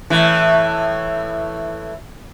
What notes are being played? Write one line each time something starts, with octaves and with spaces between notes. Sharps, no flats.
A2 E3